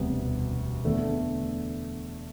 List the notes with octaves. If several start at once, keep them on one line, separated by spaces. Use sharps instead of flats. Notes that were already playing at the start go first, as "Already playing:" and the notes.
Already playing: E1 D2 C3 G3 B3
E2 D3 A3